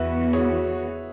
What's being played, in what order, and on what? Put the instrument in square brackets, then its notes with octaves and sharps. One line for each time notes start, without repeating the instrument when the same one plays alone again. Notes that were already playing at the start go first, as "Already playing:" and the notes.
Already playing: [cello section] E2 E3 B3 F#4 [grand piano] B4 E5
[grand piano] G#4 C#5